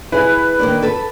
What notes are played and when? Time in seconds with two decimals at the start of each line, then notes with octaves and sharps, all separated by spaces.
0.12 E4 G#4 B4
0.59 D#3 A#3 D4
0.82 A4 B4